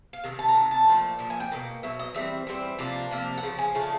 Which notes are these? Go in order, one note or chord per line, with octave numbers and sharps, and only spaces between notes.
F5
C3 D#3
A5
A#5
C3 D#3
A5
A#2 F3 A3
A#2 F3
G#5
G5
B2 F#3 A#3
B2 F#3 E5
D#5
E3 G3 C4 E5
E3 G3 C4
C3 F3 A#3 D4
C3 F3 A#3 D4
F#5
C#3 F3
G#5
C#3 F3 A3 D4